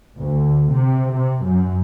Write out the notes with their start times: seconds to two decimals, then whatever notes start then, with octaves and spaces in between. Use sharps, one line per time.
0.17 D2
0.73 C3
1.12 C3
1.43 F#2